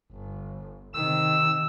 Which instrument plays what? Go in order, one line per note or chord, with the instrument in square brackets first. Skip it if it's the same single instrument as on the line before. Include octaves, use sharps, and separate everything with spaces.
[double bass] G1
[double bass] C3 D#3 [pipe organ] E6